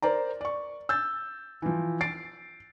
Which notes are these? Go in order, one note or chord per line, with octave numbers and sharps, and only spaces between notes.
A#4 C5 D5 A#5
D5 C#6
E6 G6 A6
E3 F3
A6 C7 D7